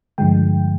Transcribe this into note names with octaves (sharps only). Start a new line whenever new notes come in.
G2 D3 F3 G#3 G5